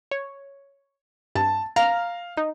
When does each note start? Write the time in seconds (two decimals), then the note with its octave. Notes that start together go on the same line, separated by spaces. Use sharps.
0.11 C#5
1.35 G2 A5
1.76 F5 A#5 F6
2.37 D#4